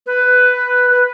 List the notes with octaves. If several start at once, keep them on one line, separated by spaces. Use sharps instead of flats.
B4
B4